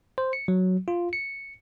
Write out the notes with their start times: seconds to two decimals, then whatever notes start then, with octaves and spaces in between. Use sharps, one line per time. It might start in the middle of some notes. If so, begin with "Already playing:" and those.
0.18 C5
0.33 C#7
0.48 F#3
0.88 F4
1.13 C#7